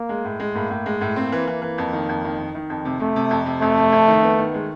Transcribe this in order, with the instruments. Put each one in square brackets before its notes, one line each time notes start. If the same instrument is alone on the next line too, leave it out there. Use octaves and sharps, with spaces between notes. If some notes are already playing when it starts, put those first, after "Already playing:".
Already playing: [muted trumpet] A#3
[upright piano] G#3
A2
G#3
[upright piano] A2 [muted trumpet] A#3
[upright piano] A2
G#3
A2
[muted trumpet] A#3 [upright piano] C4
[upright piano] E3
E3
E3
F2
D#3
F2
D#3
D#3
D#3
F2
C3
[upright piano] C3 [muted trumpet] A3
[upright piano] C3
F2
C3
[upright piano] F2 [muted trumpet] A3
[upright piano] C3
F2
D#3
B3
D#3
G#3